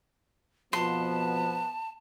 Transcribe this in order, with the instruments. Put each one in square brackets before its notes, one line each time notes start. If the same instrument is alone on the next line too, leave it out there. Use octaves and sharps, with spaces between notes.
[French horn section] F2 B2 F3 [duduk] B3 [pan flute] A5 [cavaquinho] C6